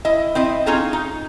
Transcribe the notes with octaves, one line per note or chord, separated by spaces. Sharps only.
E4 D#5
C4 E4 D#5
C4 C#4 D#4 F4 G#4 A4
D#4